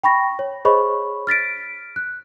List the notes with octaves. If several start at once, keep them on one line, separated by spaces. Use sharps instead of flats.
G5 B5 C#6 A#6
C#5
G#4 C5 C#5 D#5 B5 C#6
F6 A6 B6 D7
F#6